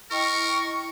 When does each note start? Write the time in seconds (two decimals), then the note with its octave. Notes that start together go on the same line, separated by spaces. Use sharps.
0.11 E4 A#4 D#5 G5 C#6